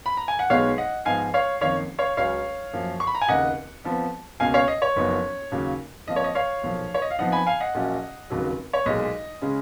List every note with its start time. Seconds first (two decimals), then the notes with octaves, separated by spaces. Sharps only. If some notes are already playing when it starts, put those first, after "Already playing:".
0.06 B5
0.17 A#5
0.28 G#5
0.39 F#5
0.50 B1 B2 G#3 B3 D#4 C#5 F5
0.78 D#5 F#5
1.05 G#2 F3 B3 D#4 F5 G#5
1.34 C#5 F5
1.61 F#1 F2 D#3 A#3 D#4 C#5 F5
1.98 C#5 F5
2.17 C#2 C#3 F#3 C#4 C#5 F5
2.73 F#2 F3 A#3
3.00 C#6
3.07 B5
3.15 A#5
3.21 G#5
3.28 F1 D#2 C#3 D#5 F#5
3.84 F2 F3 B3
4.40 C#2 B2 A#3 C#4 F5 G#5
4.54 C#5 F5
4.68 D#5
4.82 C#5
4.96 F#1 F#2 F3 B3 D#4
5.52 D#2 C#3 F#3 A#3
6.07 F2 F3 A#3 D#5
6.16 C#5
6.24 D#5
6.35 C#5 F5
6.63 B1 A#2 F3 A#3
6.94 C#5
7.02 D#5
7.11 F5
7.19 F2 F3 B3 D#4 D#5 F#5
7.32 G#5 B5
7.46 F5 G#5
7.60 D#5 F#5
7.75 A#1 A#2 F#3 A#3 C#4
8.30 F1 D#2 C#3 F#3
8.73 C#5
8.86 B1 A#2 G#3 D#5
9.41 C#3 G#3 C#4